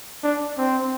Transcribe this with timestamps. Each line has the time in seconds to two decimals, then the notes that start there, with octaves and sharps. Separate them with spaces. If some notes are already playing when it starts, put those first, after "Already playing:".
0.23 D4
0.58 C4